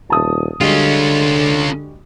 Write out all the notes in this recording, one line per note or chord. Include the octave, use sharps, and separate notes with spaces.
D#1 A5 D#6
D3 G3 G#3 C#4 F4 F#4